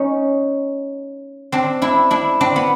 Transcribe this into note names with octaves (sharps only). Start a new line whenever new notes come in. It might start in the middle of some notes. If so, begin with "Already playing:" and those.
Already playing: C#4 D#4
C4 D4
D4 E4
D4 E4
C4 D4
B3